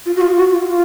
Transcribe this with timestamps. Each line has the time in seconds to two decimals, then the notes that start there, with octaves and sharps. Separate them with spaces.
0.06 F4
0.16 F#4
0.21 F4
0.36 F#4
0.51 F4
0.67 F4